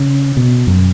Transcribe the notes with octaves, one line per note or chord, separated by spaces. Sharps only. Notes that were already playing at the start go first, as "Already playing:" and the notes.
Already playing: C#3
B2
F#2